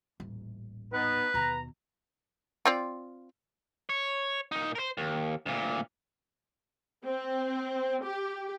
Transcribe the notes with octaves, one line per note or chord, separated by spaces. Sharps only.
D#1 A1
B3 D#4 B4
D#2 B2 A#5
C4 F4 D5
C#5
A#2 D#4
A#4 C5
D#2
D2 A#2
C4
G4